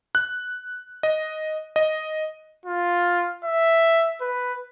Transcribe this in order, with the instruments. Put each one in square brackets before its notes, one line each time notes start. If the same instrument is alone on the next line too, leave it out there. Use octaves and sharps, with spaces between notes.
[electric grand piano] F#6
D#5
D#5
[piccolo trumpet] F4
E5
B4